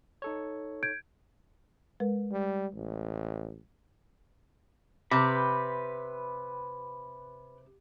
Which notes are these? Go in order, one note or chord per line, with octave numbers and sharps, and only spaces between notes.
D#4 A4 C#5
G6 G#6 D7
G#3 A#4 B4
G3
A1
C3 B4 G5 B5